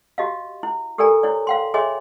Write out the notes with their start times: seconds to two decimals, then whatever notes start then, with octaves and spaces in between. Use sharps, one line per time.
0.18 F#4 G4 D#5 F5
0.63 E4
0.98 G4 A4 A#4 D5 G#5 A#5
1.23 E4 C#5 D5
1.47 F5 G5 C6
1.74 G#4 C#5 D#5 E5 G#5 C6